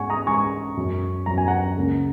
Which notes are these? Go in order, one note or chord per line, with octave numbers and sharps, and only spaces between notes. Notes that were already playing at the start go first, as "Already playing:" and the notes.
Already playing: G#2 G#3 C#4 F#5 G#5 C#6
A#5 D#6
G#2 G#3 C#4 G#5 C#6
F#2 F#3 C#4
F#2 F#3 C#4 A#5
G#5
F#5 A#5
C#2 C#3 A#3 C#4